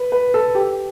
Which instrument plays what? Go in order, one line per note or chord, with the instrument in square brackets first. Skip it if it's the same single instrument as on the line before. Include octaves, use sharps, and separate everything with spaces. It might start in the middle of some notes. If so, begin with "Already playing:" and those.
Already playing: [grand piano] B4
B4
A4
G4